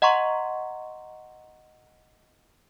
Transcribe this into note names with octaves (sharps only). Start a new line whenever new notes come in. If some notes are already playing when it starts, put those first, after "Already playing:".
D#5 F#5 A#5 C6 C#6